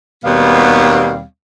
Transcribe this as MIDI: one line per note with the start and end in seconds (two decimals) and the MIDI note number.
0.25 1.23 39
0.25 1.23 47
0.25 1.23 55
0.25 1.23 59
0.25 1.23 60
0.25 1.23 77